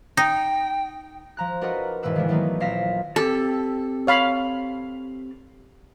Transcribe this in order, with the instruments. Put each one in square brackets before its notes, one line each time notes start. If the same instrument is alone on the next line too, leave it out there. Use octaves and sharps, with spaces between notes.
[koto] D#4 [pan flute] G5
[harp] F3 A#5 F#6
D4 F#4 A#4 B4 D#5 F#5
E1 G#2 E3 A#3 B4 E6
D#3 E3 G#3 D4
D#3 E3 F#3 A3 B3 D#4
A#1 F5 A#6 B6 E7
[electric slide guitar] C4 G4 A5 [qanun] A4
[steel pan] C#5 F5 B5